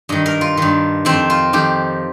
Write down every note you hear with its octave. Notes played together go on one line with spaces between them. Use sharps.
G2 D#3 D#5
A#4
F4
G2 D#3
F2 D#3 C4
F4
F2 D#3 G4